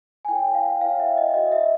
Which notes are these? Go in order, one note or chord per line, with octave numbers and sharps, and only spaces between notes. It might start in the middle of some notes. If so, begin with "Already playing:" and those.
G#5
E4 A4 C#5 G5
F5
E4 A4 C#5 F5
E5
D#5
F#4 A4 D5 D#5
E5